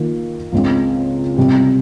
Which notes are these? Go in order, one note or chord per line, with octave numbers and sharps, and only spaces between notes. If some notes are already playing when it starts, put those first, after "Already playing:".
Already playing: D#3 A#3 F4
C#2 C#3 G#3 C4
C3 G3 C4